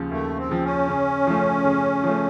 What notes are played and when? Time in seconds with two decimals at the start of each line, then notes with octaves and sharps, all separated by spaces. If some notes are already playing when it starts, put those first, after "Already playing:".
Already playing: D#2 C#3 F3
0.11 D#2 A3
0.37 C4
0.50 C#3 F3
0.63 C#4
0.88 C#3
1.27 F3 A3
1.65 C#3
2.03 F3 A3